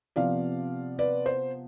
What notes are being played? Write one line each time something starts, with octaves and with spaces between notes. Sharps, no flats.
C3 F3 B3 D5 F5
B4 D5
C5